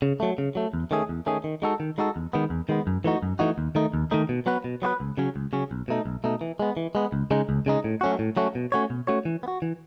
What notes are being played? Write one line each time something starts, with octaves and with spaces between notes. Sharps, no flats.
C#3
F#3 A3
C#3
F#3 A3
E2
D#3 A3 C#4 G#4
E2
D#3 A3 C#4 G#4
D#3
G#3 D#4 F#4 A4
D#3
G#3 D#4 F#4 A4
E2
D#3 G#3 B3
E2
D#3 G#3 B3
F#2
E3 A3 D#4 F#4
F#2
E3 A3 D#4 F#4
D#2
D#3 A3 D#4
D#2
D#3 A3 D#4
B2
F#3 B3 F#4 B4
B2
F#3 B3 F#4 B4
C#2
C#3 F#3 C#4
C#2
C#3 F#3 C#4
B1
B2 A3 D#4
B1
B2 A3 D#4
E3
G#3 B3
E3
G#3 B3
C#2
C#3 G#3 D#4
C#2
C#3 G#3 D#4
A2
F#3 A3 C#4 F#4
A2
F#3 A3 C#4 F#4
B2
A3 C#4 F#4 C#5
B2
A3 C#4 F#4 C#5
E3
B3
F#4
E3